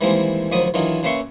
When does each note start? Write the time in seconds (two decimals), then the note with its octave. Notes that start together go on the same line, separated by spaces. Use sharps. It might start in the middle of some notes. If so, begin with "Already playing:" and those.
0.01 D#3 E3 G3 G#3 A#3 C4
0.52 D2 D#3 F3 F#3 B5 D#6
0.74 D#3 E3 F#3 D4 D#4 F4
1.03 C#3 A#3 B4 E5 C6 C#6